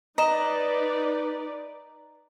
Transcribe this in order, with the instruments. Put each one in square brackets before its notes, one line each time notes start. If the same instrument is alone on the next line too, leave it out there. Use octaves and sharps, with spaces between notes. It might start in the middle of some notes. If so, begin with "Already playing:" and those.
[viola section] D#4 B4 D5 [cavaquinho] D#5 [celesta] A#5 E7